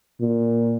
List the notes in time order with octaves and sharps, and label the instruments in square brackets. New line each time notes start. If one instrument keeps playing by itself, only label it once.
[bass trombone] A#2